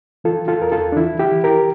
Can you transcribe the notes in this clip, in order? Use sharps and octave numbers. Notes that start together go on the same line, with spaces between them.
E3 F4 A4
E3
F4 A4
E2 A#4
F4 A4
E2
D4
E3 E4
E3
E4 G4
E3
G4 A#4